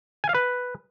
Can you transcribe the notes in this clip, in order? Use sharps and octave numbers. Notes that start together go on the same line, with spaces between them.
G#5
F5
B4